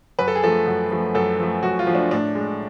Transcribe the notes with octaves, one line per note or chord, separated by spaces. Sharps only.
F#2 B4
A4
G#4
F3 A3 A4
F#2
F3 A3
F#2 A4
F3 A3
F#2 F#4
F4
F3 A3
D4
A2 D4
G#3